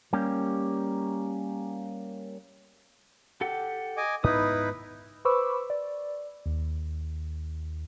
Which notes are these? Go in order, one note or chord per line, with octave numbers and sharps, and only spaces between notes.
G3 A#3 C#4 G4
G4 A4 F#5
D#5 G#5 D6
G#2 B3 D#4 E4 B4 D#6
B4 C5 B5 C#6 D6 E6
D5
D#2